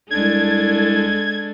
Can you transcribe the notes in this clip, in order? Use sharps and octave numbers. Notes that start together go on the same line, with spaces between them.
C2 G#3 D4 A4 G#6